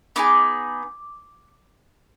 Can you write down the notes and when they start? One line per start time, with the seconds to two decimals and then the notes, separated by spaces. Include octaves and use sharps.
0.16 B3 D#4 G#4 D6